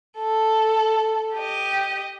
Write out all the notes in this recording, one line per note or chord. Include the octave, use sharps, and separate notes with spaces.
A4
G4 D#5